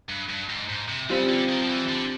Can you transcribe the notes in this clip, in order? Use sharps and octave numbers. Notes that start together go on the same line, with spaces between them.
G2
G2
G#2
G#2
C3
C#3 G3 C4 F4
D3
D#3
F3
E3
D3